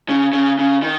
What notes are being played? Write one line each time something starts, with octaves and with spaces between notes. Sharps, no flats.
C#3
C#3
C#3
D#3